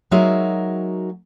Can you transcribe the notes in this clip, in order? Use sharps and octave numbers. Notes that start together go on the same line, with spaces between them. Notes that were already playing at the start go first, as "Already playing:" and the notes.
F#3 G#3 D#4 F#4 A#4 E5